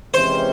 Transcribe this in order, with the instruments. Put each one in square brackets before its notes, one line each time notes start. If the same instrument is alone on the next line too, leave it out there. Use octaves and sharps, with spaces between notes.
[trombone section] C3 E3 G#3 C#4 G4 [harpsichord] C5